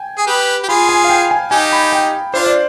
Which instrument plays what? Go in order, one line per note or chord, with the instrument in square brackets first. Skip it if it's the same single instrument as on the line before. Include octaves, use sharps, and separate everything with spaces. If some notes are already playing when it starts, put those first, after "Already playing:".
Already playing: [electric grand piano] G5 G#5
[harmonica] G#4
G4 B4
G4
[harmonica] F4 G#4 [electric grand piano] B5
[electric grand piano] G#5
F5
G5
G#5
[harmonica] D#4 G4 [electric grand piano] G#5
[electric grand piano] B5
G5
[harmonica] D4 F4 [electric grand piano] C5
[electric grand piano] D5